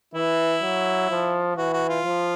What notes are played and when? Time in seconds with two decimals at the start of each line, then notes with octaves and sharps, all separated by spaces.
0.14 E3 E4
0.62 F#3
1.10 F3
1.57 E3 F#4
1.73 F#4
1.89 F4
2.05 F3